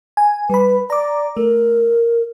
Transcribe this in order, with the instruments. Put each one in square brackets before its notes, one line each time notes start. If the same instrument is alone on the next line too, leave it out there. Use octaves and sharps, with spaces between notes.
[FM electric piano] G#5
[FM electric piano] G3 B5 [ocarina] B4
[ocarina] D5 [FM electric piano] A#5 D6
[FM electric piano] A3 [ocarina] A#4